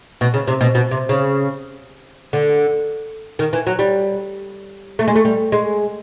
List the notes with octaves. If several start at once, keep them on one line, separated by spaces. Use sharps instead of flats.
B2
C#3
C3
B2
B2
C3
C#3
D3
D#3
E3
F#3
G3
A3
G#3
A3
G3
G#3